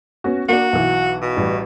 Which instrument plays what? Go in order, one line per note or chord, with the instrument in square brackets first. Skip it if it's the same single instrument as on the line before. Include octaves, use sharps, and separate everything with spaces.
[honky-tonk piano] B3 C#4 F#4
[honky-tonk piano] A#3 D4 [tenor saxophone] F#4
[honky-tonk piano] B1 E3
[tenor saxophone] B2
[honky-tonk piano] A1 G3